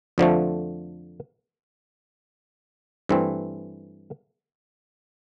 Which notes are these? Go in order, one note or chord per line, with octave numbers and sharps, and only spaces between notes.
F2 D3 F3 A3
G2 E3 A3 C4